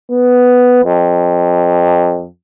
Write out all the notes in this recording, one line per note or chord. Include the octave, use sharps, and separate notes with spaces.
B3
F2